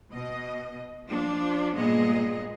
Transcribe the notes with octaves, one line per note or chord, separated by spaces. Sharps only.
B2 D#5
F3 D4
G2 A#2 G#3 B3 G#4 D#5